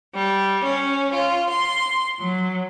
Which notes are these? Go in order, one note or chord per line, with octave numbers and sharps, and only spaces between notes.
G3
C#4
F4
C6
F#3